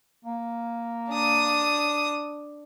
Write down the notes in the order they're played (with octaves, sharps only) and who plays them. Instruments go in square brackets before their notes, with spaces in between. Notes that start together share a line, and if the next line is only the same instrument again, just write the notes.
[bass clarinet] A#3
[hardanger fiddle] D4 D#6